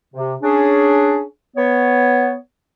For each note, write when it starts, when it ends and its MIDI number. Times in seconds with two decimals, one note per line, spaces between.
0.14 0.36 48
0.42 1.24 61
0.42 1.24 62
0.42 1.24 68
1.56 2.36 59
1.56 2.36 73